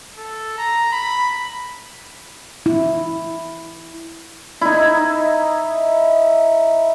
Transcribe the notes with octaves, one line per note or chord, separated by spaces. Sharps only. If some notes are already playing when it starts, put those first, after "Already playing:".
A4
A#5
B5
E4
D#4 E4